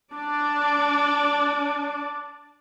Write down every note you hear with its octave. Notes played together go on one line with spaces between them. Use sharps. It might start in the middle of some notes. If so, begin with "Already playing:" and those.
D4 D5